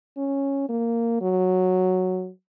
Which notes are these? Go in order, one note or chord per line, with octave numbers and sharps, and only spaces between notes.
C#4
A#3
F#3